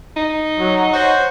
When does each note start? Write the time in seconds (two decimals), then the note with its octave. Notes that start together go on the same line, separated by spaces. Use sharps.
0.17 D#4
0.59 F#3
0.93 F#4 C5 C#5